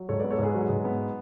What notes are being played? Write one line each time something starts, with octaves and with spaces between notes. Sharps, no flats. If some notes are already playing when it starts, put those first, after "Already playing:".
Already playing: F#3
G#2 A4 C#5
B3 B4 D5
A4 C#5
G#2 G#4 B4
F#3
G#2
B3